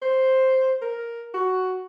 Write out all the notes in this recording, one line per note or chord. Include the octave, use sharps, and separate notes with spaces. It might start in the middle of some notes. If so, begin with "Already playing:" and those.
C5
A#4
F#4